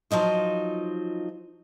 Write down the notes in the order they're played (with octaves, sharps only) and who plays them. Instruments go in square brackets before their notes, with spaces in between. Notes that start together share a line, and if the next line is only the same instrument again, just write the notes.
[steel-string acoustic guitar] F3 F#3 D#4 F4